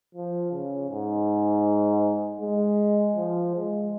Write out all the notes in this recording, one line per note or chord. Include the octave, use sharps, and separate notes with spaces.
F3
C#3
G#2
G#3
F3
G#3